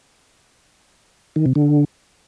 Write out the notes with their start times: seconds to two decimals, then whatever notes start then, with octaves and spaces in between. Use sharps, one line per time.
1.36 D#3
1.46 C3
1.56 D3